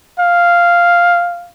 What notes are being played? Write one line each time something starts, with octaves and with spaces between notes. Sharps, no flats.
F5